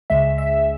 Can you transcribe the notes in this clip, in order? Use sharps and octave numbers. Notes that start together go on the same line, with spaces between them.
C#2 C#3 G#3 E5
E5